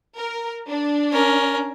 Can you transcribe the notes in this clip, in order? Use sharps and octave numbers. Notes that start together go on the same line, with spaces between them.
A#4
D4
C#4 A#4